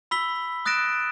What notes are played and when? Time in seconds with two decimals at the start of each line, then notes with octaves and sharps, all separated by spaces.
0.11 B5 E6 B6 G7
0.65 D#6 F#6 A6 A#6 D7 E7